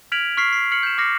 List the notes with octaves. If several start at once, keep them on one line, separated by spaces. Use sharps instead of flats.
F6 G#6 B6 D7 F7 F#7
C#6 F6 B6 C7
C7
F6 C7 C#7 F#7
G6 E7
D6 F6 A#6 C7 C#7